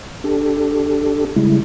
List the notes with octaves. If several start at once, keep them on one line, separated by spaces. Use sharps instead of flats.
D4 G4 A4
C#3 G3 G#3 E4